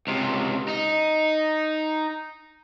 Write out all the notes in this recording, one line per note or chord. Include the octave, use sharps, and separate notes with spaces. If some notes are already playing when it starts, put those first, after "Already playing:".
C#2 C3
D#4